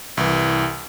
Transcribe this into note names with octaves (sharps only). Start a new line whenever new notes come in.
C2 E3